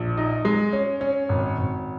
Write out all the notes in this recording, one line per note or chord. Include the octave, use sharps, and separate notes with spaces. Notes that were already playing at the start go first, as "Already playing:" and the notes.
Already playing: A#1
D#4
G#3
C#4
C#4
G#1
G#1